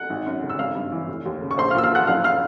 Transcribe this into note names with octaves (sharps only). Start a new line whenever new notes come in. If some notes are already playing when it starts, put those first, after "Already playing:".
Already playing: F#5 F#6
G#1
F#2
C#3
E6
G#1 F5 F6
G2
E3
F1
D#2
C#3
C#6
A#1 C5 C6
F5 F6
A#2 E6
F5 F6
F3 F#5 F#6
F#1 F5 F6
F5 F6